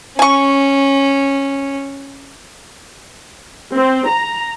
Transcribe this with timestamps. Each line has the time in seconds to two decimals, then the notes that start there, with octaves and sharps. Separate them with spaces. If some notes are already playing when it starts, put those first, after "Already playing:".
0.19 C#4 G#5 C#6
3.75 C4
4.07 A#5